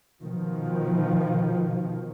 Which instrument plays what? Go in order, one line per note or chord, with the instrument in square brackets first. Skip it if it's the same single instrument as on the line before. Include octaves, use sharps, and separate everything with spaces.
[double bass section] B2 D#3 F3